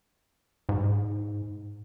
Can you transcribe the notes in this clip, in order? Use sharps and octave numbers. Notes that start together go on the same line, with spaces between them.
G#2